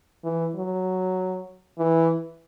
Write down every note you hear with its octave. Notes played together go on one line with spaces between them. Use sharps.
E3
F#3
E3